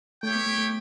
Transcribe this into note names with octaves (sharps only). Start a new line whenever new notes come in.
A3 E4 G4 C#5 G5
B3
A3
A3